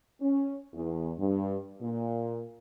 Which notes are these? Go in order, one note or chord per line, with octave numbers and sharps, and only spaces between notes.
C#4
E2
G2
A#2